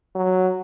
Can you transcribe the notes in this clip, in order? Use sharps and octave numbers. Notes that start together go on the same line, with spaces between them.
F#3